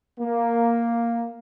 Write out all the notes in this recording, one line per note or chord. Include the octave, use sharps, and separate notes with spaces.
A#3